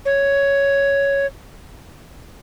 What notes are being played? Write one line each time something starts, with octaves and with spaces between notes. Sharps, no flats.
C#5